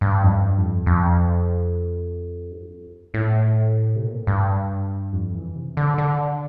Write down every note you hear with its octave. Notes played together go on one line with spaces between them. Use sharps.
G2
F2
G2
F2
F2
G2
F2
A2
C3
A#2
A2
G2
F2
E3
C3
D3
D3